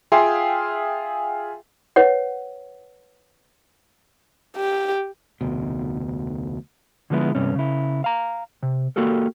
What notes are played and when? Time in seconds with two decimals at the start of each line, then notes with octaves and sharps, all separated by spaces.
0.12 F4 G#4 E5 F5 G5 C6
1.96 B4 C#5 F#5
4.57 G4
5.41 F1 D2 B2
7.10 D3 F3 G#3 B3 E4
7.35 G2 C3 C#4
7.55 C#3 E4
8.04 F5 A#5
8.63 C3
8.96 A#3 F#4 G4 A4 A#4